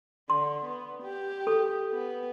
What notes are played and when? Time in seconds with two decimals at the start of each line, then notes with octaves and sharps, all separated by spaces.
0.30 D3 C6
0.65 B3
1.03 G4
1.47 A4
1.92 B3